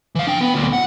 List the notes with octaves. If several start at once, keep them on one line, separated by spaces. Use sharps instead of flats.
E3 F5
D4 G5
B3
D2 A#2
F#5